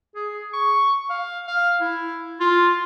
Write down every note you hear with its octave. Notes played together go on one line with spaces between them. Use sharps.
G#4
C#6
F5
F5
E4
F4